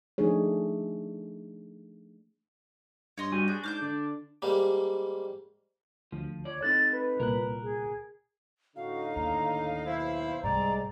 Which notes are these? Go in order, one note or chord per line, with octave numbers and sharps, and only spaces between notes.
F3 A3 D4 D#4 G#4 C#5
G2 C#5 D#5 C6
G3 F#4 G4 G#5
D4 F#4 G#4
G#2 C5 D6 F6 G6
D3 D4 D5
G#2 G3 A#3
D2 F3
C#5 D5
C4 D#4 A4 F#6 A6
B4
C2 A#2 A#4 F#6
G#4
A2 D3 D#4 F#4 F5
D#2 A#5
B1 E4 C5
C2 G#2 G#3 C4 D5 A#5